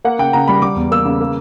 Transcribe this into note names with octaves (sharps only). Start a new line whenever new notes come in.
A#3 F#5
C#3 G5
C#3 A#5
G3 B5
G3 D6
E2
A#3 E6
C#3
A#3